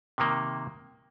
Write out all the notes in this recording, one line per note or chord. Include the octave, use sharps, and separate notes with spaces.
C3 D#3 A#3